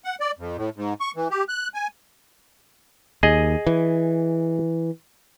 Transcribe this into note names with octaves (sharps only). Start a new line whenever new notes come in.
F#5
D5
F2
A2
G#2
C#6
E3
G4
F#6
G#5
D#2 G#4 D#5
E3